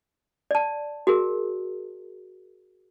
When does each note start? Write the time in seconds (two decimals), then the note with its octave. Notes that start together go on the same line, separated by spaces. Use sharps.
0.51 D5 A5
1.07 F#4 G#4 A#4